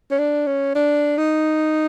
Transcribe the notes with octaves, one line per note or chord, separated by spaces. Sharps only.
C#4
D4
C#4
D4
D#4